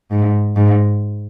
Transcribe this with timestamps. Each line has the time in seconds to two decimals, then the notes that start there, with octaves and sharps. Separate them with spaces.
0.11 G#2
0.56 G#2